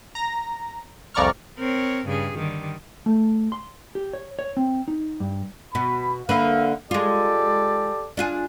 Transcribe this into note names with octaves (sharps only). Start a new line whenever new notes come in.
A#5 A#6
C2 F2 D5 A#5 C#6 F6
C4 A#4 C#5
G2 C#3 G#4
D3 D#3 G3
A3
C6
G4
C#5
C#5
C4
D#4
G2
B2 B3 B5
D3 A#3 B4 E5 F5
G#3 F4 G4 A4 D5
D4 F4 G#4